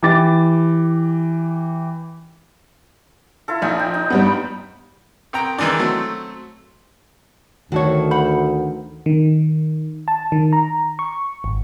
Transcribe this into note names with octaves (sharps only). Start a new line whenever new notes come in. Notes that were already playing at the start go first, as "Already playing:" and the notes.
E3 G4 D6 A6
E4 F4 A4
A#1 D#4 F5 G#5
G5
D#4
G2 G3 B3
C2 G5 A#5
D#3 E3 G#3 D4
F#3 A3 C4
D2 D#3 F#4 A4 C#5
C5 F#5 B5
D#3
A5
D#3
A#5
C#6
G#1